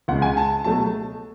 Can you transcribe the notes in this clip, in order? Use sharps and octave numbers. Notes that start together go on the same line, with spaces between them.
C#2 C#3 G#3 F#5
G#5
A5
B2 F#3 A3 A5